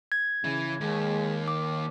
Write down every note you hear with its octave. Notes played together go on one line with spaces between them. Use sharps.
G#6
C#3 E3
D#2 G#3
D6